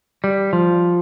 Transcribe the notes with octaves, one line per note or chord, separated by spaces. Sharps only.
G3
F3